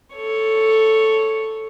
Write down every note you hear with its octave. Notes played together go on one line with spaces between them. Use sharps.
A4 C#5